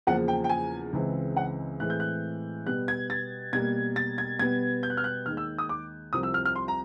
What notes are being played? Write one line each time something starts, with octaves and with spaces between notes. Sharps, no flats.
E2 C#3 F3 A#3 F#5
G5
G5
G#5
C#2 C#3 E3 G#3 C4
F#5
A2 E3 G#3 C4 F#6
G6
F#6
B2 G3 B3 F#6
G#6
A6
B2 G3 A#3 G#6
A6
G#6
B2 G3 B3 G#6
G6
F#6
F6
F#6
D#2 D#3 G#3 F6
E6
D#6
D6
C2 C3 F3 D#6
E6
F6
F6
C6
A#5